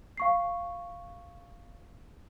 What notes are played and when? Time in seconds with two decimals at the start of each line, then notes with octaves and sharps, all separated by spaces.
0.17 F5 C#6 C7